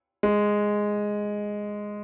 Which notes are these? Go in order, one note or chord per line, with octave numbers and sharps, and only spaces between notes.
G#3